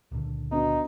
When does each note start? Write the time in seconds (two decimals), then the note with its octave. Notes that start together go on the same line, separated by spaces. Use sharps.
0.12 C#2 A#2 D3
0.51 B3 D4 D#4 F#4